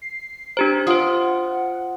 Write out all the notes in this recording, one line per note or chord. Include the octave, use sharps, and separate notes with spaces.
C7
D4 G4 C5 A#5
F4 C5 F#5 D#6